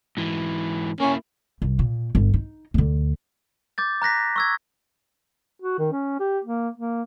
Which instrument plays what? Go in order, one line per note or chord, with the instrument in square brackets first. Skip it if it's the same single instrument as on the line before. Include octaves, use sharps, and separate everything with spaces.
[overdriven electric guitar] G#2 E3
[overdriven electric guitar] A#3 E4 [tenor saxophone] C#4
[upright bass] C2
A#2
G1
D#4
D2 D3
[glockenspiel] D6 G6 A6
A#5 F#6 A#6 B6
C#6 E6 G#6
[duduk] F#4
D#3
C#4
G4
A#3
A#3